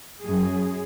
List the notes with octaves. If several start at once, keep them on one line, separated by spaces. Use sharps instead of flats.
F#2 F#3 G#4